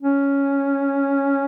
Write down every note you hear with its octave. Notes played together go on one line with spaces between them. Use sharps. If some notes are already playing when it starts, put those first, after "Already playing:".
C#4